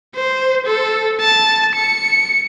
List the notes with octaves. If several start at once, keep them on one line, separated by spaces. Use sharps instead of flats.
C5
A4
A5
C#7